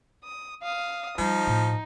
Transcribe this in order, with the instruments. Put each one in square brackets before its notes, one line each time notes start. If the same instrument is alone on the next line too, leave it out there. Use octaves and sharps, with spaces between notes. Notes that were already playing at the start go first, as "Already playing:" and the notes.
[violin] D#6
F5 D#6
[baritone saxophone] F3 [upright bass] G3 [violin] D#4
[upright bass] A2